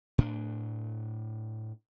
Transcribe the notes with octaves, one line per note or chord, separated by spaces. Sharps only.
A2 D4